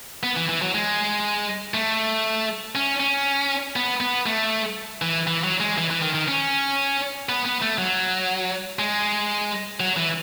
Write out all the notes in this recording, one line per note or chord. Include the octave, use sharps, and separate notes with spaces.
B3
E3
E3
F#3
G#3
A3
C#4
C#4
B3
B3
A3
E3
E3
F#3
G#3
E3
E3
D#3
D#3
C#4
B3
B3
A3
F#3
G#3
F#3
E3